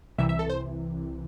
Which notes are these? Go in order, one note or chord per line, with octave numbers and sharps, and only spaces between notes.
C2 C3 E3 E5
E5
A4
C5